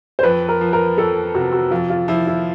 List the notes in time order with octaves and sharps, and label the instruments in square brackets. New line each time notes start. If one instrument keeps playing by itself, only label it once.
[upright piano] C5
[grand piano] F2 [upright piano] B4
[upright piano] A#4
[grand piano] F3
[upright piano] A#4
[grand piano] F2 [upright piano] A4
[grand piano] C3 [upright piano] F#4
[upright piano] F#4
[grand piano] F2 [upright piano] F4
[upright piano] F4
[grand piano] F3 [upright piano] E4
[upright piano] E4